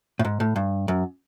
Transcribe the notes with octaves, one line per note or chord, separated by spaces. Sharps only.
A2
G#2
A2
G2
F#2